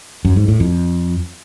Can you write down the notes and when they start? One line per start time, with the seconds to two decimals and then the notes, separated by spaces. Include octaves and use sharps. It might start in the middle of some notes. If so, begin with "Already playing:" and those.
0.25 F#2
0.36 G#2
0.48 A2
0.60 F2